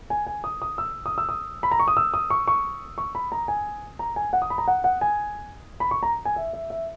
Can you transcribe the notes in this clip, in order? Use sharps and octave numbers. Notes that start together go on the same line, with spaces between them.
G#5
G#5
D#6
D#6
E6
D#6
E6
D#6
B5
A#5
C#6
D#6
E6
D#6
C#6
C#6
C#6
B5
A#5
G#5
A#5
G#5
F#5
D#6
B5
A#5
F#5
F#5
G#5
B5
C#6
A#5
G#5
E5
E5
E5